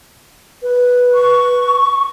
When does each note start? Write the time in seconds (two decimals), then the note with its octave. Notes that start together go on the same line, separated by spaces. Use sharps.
0.62 B4
1.14 C#6